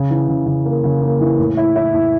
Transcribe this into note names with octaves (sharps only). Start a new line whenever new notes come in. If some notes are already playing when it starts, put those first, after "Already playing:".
Already playing: C#3
E3
C#3
C#3
A#3
C#3
A#3
E3
A2
E4
E4
A2